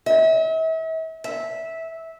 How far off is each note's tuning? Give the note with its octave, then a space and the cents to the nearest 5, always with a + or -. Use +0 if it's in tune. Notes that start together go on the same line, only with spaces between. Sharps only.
E5 -40
E5 -15